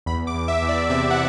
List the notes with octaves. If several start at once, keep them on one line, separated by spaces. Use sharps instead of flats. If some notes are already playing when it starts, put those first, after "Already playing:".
E2 B5
D6
E2
E5
E2
D5
C3 E5
F#5